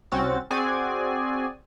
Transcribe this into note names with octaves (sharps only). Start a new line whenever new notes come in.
C2 C4 C#4 F#4 A6
C4 F#4 G#4 D5 G#5